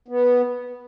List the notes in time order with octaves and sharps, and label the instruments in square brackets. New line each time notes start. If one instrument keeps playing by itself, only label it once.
[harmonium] B3